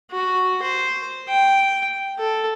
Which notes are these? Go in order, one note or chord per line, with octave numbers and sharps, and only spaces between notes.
F#4
C5
G5
A4